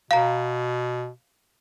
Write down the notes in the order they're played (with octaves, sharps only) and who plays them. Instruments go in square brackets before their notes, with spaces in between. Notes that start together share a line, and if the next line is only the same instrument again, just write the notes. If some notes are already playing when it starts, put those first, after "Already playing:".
[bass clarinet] B2 [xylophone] F5 A#5